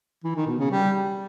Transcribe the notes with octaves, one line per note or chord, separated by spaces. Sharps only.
E3
D#3
B2
C#3
G3